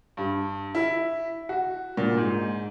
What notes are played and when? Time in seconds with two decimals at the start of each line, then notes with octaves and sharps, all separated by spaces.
0.17 G2
0.75 E4
1.49 F#4
1.97 A#2
2.17 G#2